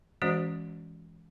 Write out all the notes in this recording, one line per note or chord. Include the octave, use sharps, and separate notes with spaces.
E3 G#3 C#4 F#4 C5 D#5